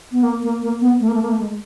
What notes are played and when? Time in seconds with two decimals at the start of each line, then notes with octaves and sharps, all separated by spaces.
0.12 B3
0.23 A#3
0.43 A#3
0.62 A#3
0.81 B3
1.00 A3
1.08 A#3
1.14 A3
1.22 A#3
1.29 A3
1.39 G#3